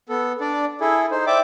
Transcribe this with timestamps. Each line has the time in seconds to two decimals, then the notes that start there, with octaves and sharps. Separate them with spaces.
0.09 B3 A4
0.41 D4 D5
0.81 E4 G#4 A4
1.11 D#4 C5
1.27 D5 E5 G5 D6